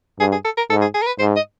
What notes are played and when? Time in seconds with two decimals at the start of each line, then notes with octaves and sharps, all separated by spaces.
0.19 G2 G#4
0.32 G#4
0.45 A4
0.57 A#4
0.70 G#2 A4
0.82 G#4
0.94 G#4
1.02 A#4
1.07 B4
1.19 G#2 C5
1.36 D#5